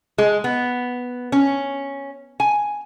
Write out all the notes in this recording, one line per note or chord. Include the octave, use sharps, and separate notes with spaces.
G#3
B3
C#4
G#5